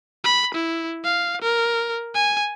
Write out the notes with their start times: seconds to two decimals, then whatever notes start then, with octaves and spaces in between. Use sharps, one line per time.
0.24 B5
0.55 E4
1.04 F5
1.42 A#4
2.14 G#5